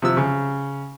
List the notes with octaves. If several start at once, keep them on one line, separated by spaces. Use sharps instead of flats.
C3 F3 E6
C#3